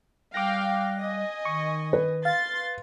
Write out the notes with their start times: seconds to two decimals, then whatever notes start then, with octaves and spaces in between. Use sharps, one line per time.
0.34 G3 F5 G5 D6 F#6 A#6
1.00 D#5 G#5
1.45 D#3 C#6
1.93 B4
2.25 F5 C6 A6